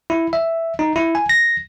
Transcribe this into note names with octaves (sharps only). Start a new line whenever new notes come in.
E4
E5
D#4
E4
G#5
A#6